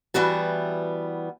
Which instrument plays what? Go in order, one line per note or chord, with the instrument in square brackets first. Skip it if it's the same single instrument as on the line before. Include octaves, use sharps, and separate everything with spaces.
[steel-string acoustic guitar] E3 G3 B3 F#4 A5